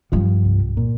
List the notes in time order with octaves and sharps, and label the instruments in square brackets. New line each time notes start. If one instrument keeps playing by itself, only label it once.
[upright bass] G2 [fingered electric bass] F3
[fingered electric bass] C2
A#2